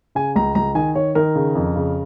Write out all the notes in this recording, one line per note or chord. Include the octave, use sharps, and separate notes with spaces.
C#3 G#5
C#2 A#5
C#2 A#5
D#3 G#5
D#3 C#5
D#3 A#4
C#3
F2
C#3